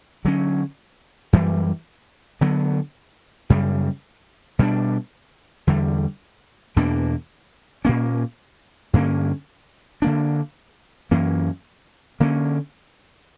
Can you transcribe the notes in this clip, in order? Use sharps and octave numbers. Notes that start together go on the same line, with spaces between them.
D3 F#3 C#4
F#2 E3 G3
D3 F#3 B3
F#2 C#3 G3
B2 G3 B3 D4
E2 D3 G3
E2 B2 A#3 D4
A#2 A#3 C#4
G2 D3 A#3 C#4
D3 A#3 D4
F#2 E3 A#3 C#4
D3 A#3 C#4